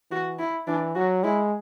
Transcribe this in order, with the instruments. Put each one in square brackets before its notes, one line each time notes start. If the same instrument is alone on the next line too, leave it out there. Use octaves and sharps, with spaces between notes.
[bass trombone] E3 [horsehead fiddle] F#4
[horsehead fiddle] E4
[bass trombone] E3 [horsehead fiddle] D4
[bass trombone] F#3 [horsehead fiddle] F#4
[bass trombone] G#3 [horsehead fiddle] E4